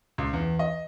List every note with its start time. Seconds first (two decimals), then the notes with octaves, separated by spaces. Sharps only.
0.18 C#2
0.33 E2
0.59 D#5